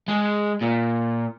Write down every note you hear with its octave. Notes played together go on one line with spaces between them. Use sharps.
G#3
A#2